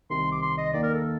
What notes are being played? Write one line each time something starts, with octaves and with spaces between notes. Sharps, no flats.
C2 C3 D#3 C6
D6
C6
D#5
D#2 D#3 A#3 D5
A#4
A4